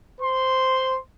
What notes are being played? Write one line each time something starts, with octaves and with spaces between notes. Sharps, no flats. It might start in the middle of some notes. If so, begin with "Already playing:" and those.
C5 C6